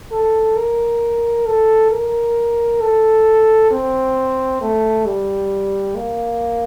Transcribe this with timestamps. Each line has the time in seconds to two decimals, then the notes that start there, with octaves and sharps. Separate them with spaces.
0.12 A4
0.57 A#4
1.46 A4
1.92 A#4
2.81 A4
3.71 C4
4.61 A3
5.06 G3
5.96 A#3